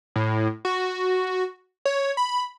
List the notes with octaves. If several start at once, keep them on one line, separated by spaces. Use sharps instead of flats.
A2
F#4
C#5
B5